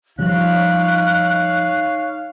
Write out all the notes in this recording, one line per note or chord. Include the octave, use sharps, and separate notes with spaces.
F3 G3 C#4 D#4 C#5 F5 F#6